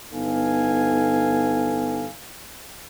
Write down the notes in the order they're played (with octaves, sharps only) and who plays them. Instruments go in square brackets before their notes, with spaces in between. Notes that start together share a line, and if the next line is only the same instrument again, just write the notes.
[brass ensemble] G1 B3 D#4 A4 F5 G#5